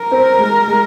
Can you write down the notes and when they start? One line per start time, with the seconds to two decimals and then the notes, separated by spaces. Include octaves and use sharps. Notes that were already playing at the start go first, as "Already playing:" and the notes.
Already playing: A#4
0.11 C4
0.39 G#3
0.68 G#3